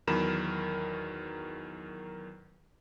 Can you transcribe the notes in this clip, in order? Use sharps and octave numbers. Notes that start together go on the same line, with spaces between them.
E2 D#3 F#3 A#4 B5 E7